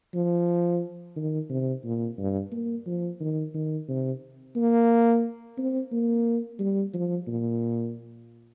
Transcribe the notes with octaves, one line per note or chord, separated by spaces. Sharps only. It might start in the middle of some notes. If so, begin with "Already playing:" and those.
F3
D#3
C3
A#2
G2
A#3
F3
D#3
D#3
C3
A#3
C4
A#3
G3
F3
A#2